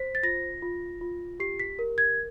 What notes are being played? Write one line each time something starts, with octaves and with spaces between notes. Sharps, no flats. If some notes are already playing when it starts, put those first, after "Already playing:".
Already playing: C5 B6
A6
F4 A#6
F4
F4
G4 C7
B6
A#4
G#6